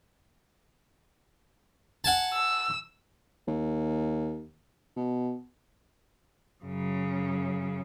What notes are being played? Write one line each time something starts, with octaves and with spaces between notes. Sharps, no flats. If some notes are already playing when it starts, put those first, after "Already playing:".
F#5 G#5 A5
E6
D#2
B2
F#2 C#3